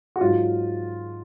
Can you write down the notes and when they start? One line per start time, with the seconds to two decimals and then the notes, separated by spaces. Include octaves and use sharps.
0.16 F#4
0.20 G#2 F#3 F4